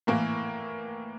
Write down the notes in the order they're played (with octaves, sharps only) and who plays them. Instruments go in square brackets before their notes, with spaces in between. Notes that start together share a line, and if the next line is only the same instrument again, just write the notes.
[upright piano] A2 E3 A#3 A#4